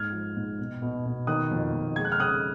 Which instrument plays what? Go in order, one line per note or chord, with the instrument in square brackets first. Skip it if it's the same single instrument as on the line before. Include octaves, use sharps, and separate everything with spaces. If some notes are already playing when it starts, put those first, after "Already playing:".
Already playing: [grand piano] G#2 F6 G#6
F3
G#2
B2
B2
B2
D#3 D#6 F#6
F2
F2
G#3 G#6
F#6
F6
C#3 D#6 F#6